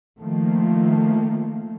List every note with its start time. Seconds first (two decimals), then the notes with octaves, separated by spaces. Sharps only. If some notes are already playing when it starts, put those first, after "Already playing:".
0.20 D#3 F3 A3 A#3